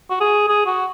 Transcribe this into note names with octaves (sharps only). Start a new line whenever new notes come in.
F#4
G#4
G#4
F#4